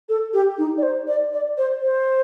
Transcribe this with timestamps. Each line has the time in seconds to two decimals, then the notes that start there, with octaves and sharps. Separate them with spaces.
0.09 A4
0.33 G4
0.58 D#4
0.78 D5
0.83 C5
1.08 D5
1.33 D5
1.58 C5
1.82 C5